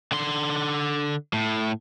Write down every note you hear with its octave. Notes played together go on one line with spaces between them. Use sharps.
D3 C6
A2